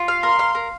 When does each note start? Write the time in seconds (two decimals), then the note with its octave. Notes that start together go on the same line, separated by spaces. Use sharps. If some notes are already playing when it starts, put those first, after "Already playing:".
Already playing: F4
0.08 F5
0.23 A#4 C6
0.39 F5
0.55 A#4